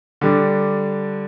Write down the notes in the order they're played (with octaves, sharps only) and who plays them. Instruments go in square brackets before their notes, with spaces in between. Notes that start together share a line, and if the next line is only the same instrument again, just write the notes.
[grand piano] D3 G3 D4